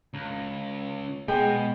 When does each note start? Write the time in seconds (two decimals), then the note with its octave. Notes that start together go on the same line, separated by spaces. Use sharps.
0.14 C#2
1.28 B2 G#3 G5